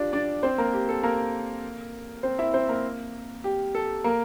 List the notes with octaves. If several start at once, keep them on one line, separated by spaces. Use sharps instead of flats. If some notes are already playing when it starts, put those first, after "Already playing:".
Already playing: D4 F4 G4 D5
D4 D5
C4 C5
A#3 A#4
G4
A4
A#3 A#4
C4 C5
E4 E5
C4 C5
A#3 A#4
G4
A4
A#3 A#4